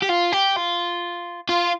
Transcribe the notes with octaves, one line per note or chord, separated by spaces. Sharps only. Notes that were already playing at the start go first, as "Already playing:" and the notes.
G4
F4
G4
F4
F4